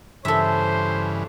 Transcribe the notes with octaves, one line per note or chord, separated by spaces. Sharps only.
G2 C#3 E3 A4 C5 E5